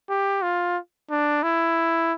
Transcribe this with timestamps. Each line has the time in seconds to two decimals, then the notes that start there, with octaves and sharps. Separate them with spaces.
0.09 G4
0.42 F4
1.11 D4
1.43 E4